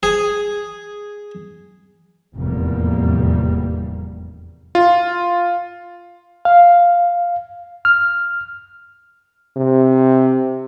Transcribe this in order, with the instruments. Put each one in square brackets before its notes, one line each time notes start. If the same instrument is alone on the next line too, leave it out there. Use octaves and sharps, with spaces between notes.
[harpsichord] G#4
[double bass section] F1 E2 A2 G3 A#3
[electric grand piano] F4
[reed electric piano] F5
F6
[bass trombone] C3